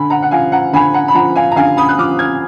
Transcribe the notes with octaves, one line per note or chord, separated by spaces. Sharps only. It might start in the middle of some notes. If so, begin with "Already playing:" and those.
Already playing: D3 G#5 B5
F#5 A#5
F#5
F3 F5 G#5
F#5 A#5
D3 G#5 B5
F#5 A#5
B5
F3 F#5 A#5
F5 G#5
A#5
D3 F5 G#5
B5 D#6
F#6
F3 D6 F6
F6 G#6